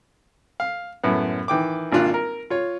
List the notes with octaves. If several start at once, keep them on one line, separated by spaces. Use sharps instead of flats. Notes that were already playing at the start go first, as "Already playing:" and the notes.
F5
F#2 A2 B3
D#3 E3 G5 D6
G#1 A#3 D4 F4 D5 F#6
A#4
F4 C#5